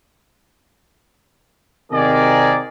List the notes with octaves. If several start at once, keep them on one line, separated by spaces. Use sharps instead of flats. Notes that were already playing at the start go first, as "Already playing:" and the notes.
C3 D#3 C4 G#4 A#4 D5